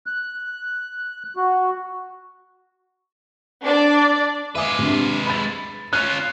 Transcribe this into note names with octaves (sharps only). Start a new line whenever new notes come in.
F#6
F#4
D4 D5
G#3 B4 E5 G#5 D6
C3 D4
B5 A6
C#4 F4 F#6